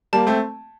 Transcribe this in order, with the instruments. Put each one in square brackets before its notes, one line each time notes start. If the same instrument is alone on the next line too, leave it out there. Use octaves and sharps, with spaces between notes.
[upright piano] G3 A#3 [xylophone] A5
[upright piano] A3 C4